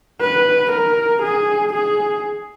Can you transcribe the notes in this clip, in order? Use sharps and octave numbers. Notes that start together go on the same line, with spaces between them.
B4
A#4
G#4
G#4